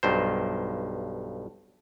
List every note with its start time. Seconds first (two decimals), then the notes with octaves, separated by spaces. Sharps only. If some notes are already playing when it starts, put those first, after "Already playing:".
0.03 B1 G2 C5